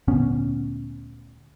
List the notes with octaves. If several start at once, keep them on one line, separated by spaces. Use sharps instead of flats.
D2 A#2 B3 C#4